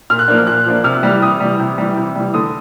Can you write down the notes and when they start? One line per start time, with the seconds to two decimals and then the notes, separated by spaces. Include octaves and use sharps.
0.10 A#2 F6
0.19 F#6
0.28 F3 A#3 D4
0.38 F6
0.47 A#2 F#6
0.66 F3 A#3 D4
0.84 C3 F6
1.03 E3 G3
1.22 C3 D#6
1.40 E3 G3
1.60 C3
1.78 E3 G3
1.97 C3
2.16 E3 G3
2.34 D3 D#6